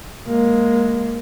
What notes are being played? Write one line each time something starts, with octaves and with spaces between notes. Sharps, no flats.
G#3 A#3